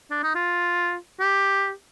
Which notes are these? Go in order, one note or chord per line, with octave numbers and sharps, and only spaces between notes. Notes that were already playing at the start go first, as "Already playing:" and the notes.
D4
D#4
F4
G4